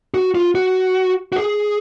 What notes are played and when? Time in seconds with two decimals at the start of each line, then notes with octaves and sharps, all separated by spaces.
0.14 F#4
0.35 F4
0.55 F#4
1.32 F#4
1.36 G#4